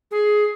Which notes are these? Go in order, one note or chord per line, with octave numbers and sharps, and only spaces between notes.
G#4